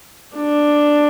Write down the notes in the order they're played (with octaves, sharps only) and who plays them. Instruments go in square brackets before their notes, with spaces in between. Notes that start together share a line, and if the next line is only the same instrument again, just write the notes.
[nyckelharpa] D4